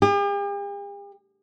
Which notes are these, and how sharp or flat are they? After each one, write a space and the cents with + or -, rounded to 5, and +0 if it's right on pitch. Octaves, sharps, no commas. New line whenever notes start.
G4 +45